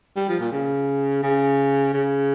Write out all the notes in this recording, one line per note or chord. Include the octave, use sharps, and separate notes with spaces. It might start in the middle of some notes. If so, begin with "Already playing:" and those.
G3
F3
A#2
C#3
C#3
C#3